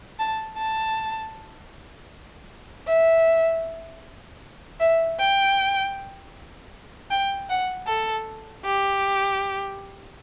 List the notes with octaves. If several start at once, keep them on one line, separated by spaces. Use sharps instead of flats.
A5
A5
E5
E5
G5
G5
F#5
A4
G4